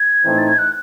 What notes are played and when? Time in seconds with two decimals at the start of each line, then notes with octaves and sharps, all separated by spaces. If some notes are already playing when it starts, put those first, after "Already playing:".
Already playing: G#6
0.25 A2 E3 A3 C4 D#4
0.38 A6
0.48 G#6
0.58 F#6